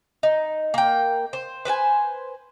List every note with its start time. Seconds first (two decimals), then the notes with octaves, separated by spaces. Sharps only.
0.23 D#4
0.74 A#3 G5
1.33 C5
1.65 B4 C5 F#5 G#5